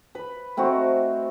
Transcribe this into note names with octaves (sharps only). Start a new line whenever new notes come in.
B4 B5
A3 C4 D#4 F#4